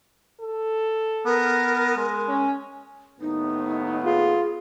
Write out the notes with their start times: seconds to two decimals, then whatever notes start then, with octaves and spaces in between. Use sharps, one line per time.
0.41 A4
1.25 B3 A#4
1.97 G#3
2.28 C#4
3.21 D#2 A2 B3 D#4
4.04 F4 G#4